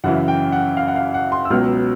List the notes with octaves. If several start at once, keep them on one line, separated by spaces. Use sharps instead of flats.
F#2 C#3 E3 F#5
G5
F#5
F5
F#5
F5
F#5
C6
E6
C#2 B2 F#3 B3 F6